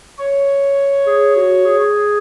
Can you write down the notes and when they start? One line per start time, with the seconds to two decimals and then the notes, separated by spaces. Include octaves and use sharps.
0.19 C#5
1.06 G#4
1.36 F#4
1.65 G#4